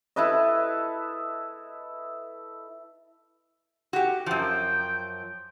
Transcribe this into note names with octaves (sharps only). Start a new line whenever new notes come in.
E4 A4 B4 D#5
F#4 G4
F#2 F3 G5